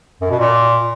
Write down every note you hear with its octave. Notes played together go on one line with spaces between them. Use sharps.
F#2
B2
A#2